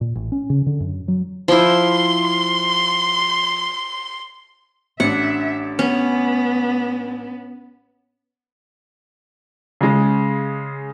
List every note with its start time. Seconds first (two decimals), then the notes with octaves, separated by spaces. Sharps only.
0.01 A#2
0.15 A1
0.32 C#4
0.50 C#3
0.66 D3
0.80 F#2
1.08 F#3
1.48 F3 E4 C6
5.00 A1 D4 E5 F#5
5.79 B3 C#4
9.81 C#3 G#3